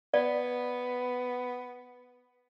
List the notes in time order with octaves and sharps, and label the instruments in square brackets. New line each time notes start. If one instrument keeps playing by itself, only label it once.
[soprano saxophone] B3 [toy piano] D5